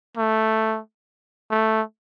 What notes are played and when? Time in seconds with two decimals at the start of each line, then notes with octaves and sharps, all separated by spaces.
0.17 A3
1.51 A3